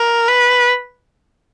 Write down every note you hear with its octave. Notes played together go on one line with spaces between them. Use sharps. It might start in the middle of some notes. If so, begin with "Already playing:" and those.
Already playing: A#4
B4